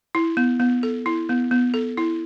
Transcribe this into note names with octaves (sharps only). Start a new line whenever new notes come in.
E4
B3
B3
A4
E4
B3
B3
A4
E4